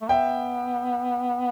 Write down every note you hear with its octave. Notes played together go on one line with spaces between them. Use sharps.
A3
B3 E5 G5